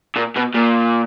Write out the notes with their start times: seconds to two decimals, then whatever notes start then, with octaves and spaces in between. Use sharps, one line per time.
0.16 A#2
0.36 B2
0.55 A#2